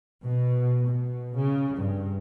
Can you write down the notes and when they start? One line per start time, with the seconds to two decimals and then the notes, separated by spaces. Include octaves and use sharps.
0.24 B2
0.84 B2
1.35 C#3
1.77 G2